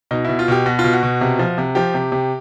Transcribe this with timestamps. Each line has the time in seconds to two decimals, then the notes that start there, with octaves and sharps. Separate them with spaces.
0.11 B2 D#4
0.25 B2 E4
0.39 F4
0.48 B2 G4
0.66 B2 F#4
0.79 F4
0.84 B2
0.93 F#4
1.03 B2
1.21 C3
1.39 F3
1.58 C3
1.75 F3 G4
1.94 C3
2.12 C3